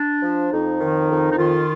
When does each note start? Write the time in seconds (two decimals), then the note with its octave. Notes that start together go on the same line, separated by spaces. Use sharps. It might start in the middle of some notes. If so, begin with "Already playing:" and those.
Already playing: D4
0.22 F3
0.51 F2 D#4
0.81 D#3
1.10 F2
1.31 D#4
1.38 D#3 F4